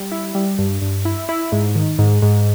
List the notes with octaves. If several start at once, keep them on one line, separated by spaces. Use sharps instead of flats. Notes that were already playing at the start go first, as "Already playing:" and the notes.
Already playing: G3
E4
G3
G2
G2
E4
E4
G#2
D#3
G#2
G#2